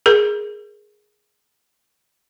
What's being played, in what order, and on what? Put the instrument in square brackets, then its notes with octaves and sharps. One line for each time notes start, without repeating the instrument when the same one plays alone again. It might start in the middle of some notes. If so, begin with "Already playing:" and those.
[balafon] G#4 A#4